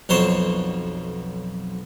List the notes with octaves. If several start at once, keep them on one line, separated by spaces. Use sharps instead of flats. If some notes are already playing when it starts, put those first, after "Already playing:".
B1 F2 C5 C#5 A5